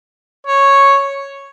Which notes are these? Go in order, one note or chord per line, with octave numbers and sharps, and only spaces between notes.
C#5